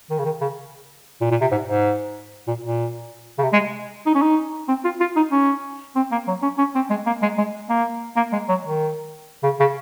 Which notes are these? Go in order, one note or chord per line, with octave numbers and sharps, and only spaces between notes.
D#3
C#3
D#3
C#3
A#2
A#2
C3
G#2
G#2
A#2
A#2
C#3
C3
G#3
D#4
C#4
D#4
C4
F4
F4
D#4
C#4
C4
A#3
F#3
C#4
C#4
C4
G#3
A#3
G#3
G#3
A#3
A#3
G#3
F#3
D#3
C#3
C#3